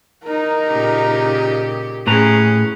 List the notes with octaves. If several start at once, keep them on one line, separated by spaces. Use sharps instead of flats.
D#4 A#4
A#2 C#3 G4
A2 C#4 G#4 B4 A#5